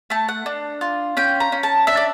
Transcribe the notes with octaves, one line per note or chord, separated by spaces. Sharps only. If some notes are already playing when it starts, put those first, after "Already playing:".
A3 A5
F#5
D4
F4
C#4 G5
A#5
C#4
A5
D4 E5
D5